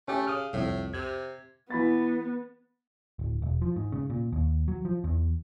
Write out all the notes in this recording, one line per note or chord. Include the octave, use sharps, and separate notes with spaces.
A3 C#4 G4
C#3 D#6 F6
C2 F2 A2
C3 G#6
E3 B3 B5 A6
D1
E1
F3
G#2
C#3
A#2
D#2
F#3
F3
E2